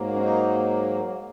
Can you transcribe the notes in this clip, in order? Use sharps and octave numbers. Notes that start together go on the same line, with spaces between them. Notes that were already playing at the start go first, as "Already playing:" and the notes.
Already playing: G#2 F#3 A#3
C#4
D#4